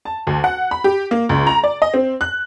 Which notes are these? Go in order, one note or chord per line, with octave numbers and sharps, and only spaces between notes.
A5
D2
F#5
B5
G4
A#3
C#2
A#5
D5
D#5
C4
F#6